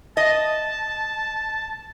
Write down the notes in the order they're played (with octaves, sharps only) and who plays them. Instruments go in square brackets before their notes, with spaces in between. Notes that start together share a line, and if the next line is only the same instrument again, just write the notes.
[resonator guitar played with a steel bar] D#5 [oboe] A5